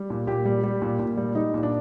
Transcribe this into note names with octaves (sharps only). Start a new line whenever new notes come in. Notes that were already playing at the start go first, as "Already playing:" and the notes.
Already playing: G3
A#2
A#2 G4
G3
G3
A#2
A#2
G3
G3 D#4
A#2
D4